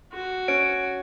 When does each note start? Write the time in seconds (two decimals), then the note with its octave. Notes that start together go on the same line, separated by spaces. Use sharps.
0.13 F#4
0.48 C#4 D7